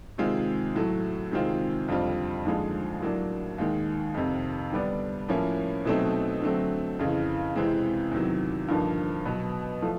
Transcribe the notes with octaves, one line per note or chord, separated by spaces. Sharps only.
C3 D#3 G#3 C4 F4
A2 F#3 A3
C3 D#3 G#3 C4 F4
F2 D3 G3 C4 F4
D#2 D3 F3 G#3
A2 F#3 A#3 D4
D#2 D#3 G#3
F2 C3 D#3
D3 G3 B3 D4
A2 F3 A#3 C#4 E4
B2 F#3 A3 C4 D#4
D3 F#3 A3 C4
F2 C#3 E3
C3 E3 G#3 C4
E2 C3 D#3 F#3
G2 D3 F3 A#3 D#4
B2 F#3 B3
F3 A3